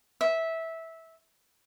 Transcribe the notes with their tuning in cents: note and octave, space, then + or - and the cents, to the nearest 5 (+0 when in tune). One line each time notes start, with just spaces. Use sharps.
E5 -15